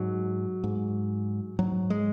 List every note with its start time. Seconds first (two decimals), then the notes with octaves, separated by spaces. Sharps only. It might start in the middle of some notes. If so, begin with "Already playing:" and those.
Already playing: G#2 F#3
0.64 G#2
1.59 G#2 F#3
1.90 G#3